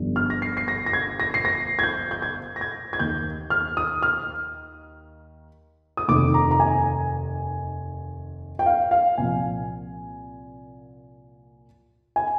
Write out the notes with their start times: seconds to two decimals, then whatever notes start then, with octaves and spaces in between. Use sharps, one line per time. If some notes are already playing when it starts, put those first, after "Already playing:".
Already playing: G1 G2 D3 F3
0.16 F6
0.30 A#6
0.42 C7
0.57 C7
0.68 A#6
0.86 A#6
0.93 G#6
1.20 A#6
1.34 C7
1.45 A#6
1.79 G#6
1.83 G6
2.11 G6
2.22 G#6
2.56 A#6
2.61 G#6
2.93 G#6
2.99 D#2 D#3 G6
3.50 F6
3.77 D#6
4.02 F6
5.97 D#6
6.08 F1 D#2 D#3 D6
6.34 A#5
6.51 A#5
6.60 G#5
8.59 G5
8.66 F5
8.91 F5
9.18 C2 A#2 F3 G#5
12.16 G#5